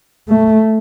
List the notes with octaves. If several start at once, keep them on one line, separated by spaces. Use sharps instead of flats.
A3